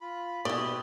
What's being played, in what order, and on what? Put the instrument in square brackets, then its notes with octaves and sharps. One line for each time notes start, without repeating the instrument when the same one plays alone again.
[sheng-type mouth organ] F4 B5
[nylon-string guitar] B2 [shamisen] E4 D5 [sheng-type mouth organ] G4 B4 [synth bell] D#6 F#7 G7